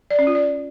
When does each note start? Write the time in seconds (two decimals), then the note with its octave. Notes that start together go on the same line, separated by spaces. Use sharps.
0.10 D5
0.19 C#4
0.27 F4
0.35 D5